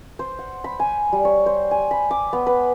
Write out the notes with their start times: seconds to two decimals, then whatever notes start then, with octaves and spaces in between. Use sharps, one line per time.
0.19 C5
0.39 F#5
0.64 B5
0.80 G#5
1.12 G3
1.25 C#5
1.46 C5
1.71 G#5
1.91 B5
2.11 D6
2.33 B3
2.47 B4